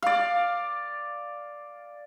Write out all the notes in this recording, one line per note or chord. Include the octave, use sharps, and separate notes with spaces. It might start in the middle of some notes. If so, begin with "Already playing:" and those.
D5 F5